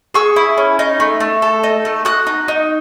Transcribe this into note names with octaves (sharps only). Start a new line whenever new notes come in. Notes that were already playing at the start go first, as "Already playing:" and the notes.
G#4 C#6 E6
E4
C#4
D#4
A3
A3
A4
D#4
A3
F#4 D#6 F#6
D#4
D#4